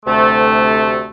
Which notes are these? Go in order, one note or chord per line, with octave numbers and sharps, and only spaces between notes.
D2 C3 A3